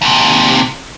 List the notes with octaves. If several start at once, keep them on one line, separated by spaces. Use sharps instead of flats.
D#2 C3